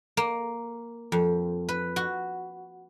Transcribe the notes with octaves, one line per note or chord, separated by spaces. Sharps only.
A#3
F2
B4
F#4